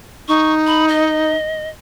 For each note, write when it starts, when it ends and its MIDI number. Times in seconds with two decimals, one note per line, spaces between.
0.28 1.34 63
0.28 0.52 85
0.67 0.87 83
0.88 1.69 75